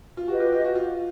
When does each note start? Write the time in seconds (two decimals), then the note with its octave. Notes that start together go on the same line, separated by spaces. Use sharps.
0.17 F4
0.28 F#4 G4 B4 D#5
0.40 F4
0.52 F4
0.64 F#4
0.75 F4